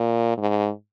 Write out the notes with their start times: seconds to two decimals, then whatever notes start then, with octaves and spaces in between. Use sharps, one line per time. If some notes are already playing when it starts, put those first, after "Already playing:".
Already playing: A#2
0.38 G#2